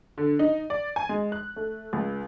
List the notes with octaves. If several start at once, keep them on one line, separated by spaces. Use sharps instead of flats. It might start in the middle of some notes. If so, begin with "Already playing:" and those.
D3
D#4
D5
G#5
G#3
F#6
A3
C#2